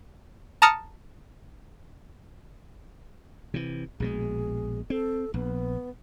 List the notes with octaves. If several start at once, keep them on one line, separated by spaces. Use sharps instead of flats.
A5 A#5 D#6 F6 C#7
C3 E3
A#1 B2 G#3 G#4
C4 A4
A#1 B3